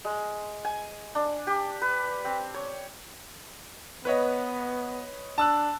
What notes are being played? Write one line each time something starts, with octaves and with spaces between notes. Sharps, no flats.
G#3
G#5
D4
G4
B4
C4
C#5
B3 B4 C#5 D#5
D4 A5 E6 F#6